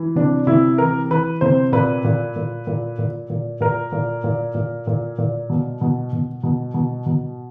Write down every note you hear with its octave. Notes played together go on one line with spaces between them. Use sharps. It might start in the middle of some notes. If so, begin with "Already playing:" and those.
Already playing: E3
C3 D4
C3 E4
E3 A#4
E3 B4
C3 C5
A#2 B4
A#2
A#2
A#2
A#2
A#2
A#2 A#4
A#2
A#2
A#2
A#2
A#2
B2
B2
B2
B2
B2
B2